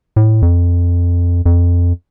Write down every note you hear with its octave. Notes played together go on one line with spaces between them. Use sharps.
A2
F2
F2